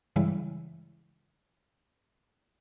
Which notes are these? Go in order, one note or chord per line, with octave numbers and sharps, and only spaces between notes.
G2 C#3 E3 G3 G#3 E4